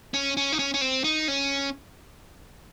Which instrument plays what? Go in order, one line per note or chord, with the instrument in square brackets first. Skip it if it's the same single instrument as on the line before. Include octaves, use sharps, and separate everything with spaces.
[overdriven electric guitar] C#4
C#4
D#4
C#4
C#4
C4
D#4
C#4